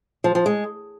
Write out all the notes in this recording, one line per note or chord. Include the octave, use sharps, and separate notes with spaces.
F3
F3
G#3